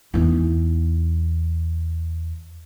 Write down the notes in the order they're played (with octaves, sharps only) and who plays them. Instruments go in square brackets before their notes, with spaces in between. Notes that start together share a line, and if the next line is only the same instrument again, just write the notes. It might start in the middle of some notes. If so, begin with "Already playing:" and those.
[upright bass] E2 D#4